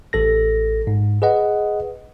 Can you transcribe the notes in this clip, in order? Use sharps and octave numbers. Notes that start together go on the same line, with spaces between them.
A1 A4 A#6
G#2
G#4 B4 D#5 F#5